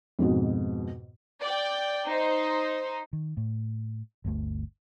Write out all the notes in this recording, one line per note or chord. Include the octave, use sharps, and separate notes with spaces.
F2 G#2 B2
D5 G5
D#4 C5
D#3
A2
G1 D2 A3